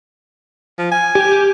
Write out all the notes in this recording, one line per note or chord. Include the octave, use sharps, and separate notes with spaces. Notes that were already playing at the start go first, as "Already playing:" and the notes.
F3
G#5
G4
G4